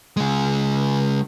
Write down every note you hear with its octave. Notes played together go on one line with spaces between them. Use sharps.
C#3 G#3